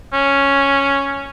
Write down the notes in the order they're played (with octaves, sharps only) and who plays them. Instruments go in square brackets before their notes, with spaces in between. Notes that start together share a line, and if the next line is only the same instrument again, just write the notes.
[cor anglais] C#4